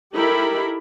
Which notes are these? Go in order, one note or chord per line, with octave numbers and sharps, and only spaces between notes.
D#4 E4 G4 A4 A#4 B5